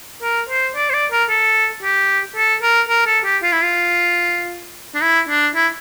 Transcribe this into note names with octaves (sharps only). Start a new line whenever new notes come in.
A#4
C5
D5
C5
D5
A#4
A4
G4
A4
A#4
A#4
A4
G4
F4
E4
F4
D4
E4
D4
E4